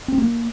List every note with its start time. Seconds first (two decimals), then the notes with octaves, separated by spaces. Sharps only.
0.08 C4
0.18 A#3